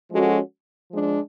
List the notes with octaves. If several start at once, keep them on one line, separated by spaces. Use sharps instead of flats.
F3 G#3 C#4 F#4 A4
F3 G#3 D4